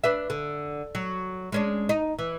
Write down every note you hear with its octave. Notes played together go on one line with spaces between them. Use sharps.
D4 B4 E5
D3
F#3
G#3 C#4 D4
D#4
E3